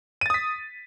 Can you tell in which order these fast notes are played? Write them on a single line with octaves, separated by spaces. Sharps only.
D#7 A6 D#6 B6